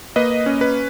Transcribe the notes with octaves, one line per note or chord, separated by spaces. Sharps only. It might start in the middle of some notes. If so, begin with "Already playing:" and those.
A#3 B4 D#5
C#4
B4